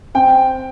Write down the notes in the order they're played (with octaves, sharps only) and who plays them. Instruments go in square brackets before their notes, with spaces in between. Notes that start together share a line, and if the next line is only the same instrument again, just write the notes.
[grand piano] C4 [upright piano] G5